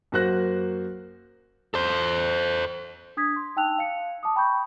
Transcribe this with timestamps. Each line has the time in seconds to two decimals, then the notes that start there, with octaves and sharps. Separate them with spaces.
0.12 F#2 A#3 F#4 C5 F#6 A#6
1.74 A4 C5
3.17 D4 D#6 G#6 B6
3.36 C6
3.56 D#4 G5 A5 E6 F#6 F7
3.78 F5 C#7
4.23 A5 D6 D#6
4.36 G5 B5 C#6 G6